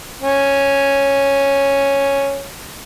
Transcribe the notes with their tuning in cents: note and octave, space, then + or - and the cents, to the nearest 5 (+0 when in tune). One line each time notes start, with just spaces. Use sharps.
C#4 -5